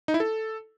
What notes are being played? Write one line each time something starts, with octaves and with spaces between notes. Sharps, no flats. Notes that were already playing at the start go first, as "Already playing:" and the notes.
D#4
E4
A4